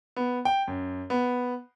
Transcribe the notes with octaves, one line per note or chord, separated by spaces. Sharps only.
B3
G5
F#2
B3